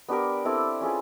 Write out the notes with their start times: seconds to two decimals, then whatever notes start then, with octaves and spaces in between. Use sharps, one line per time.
0.09 B3 D4 G4 A#4
0.45 C4 E4 A4 D5
0.81 C#4 F4 G#4 B4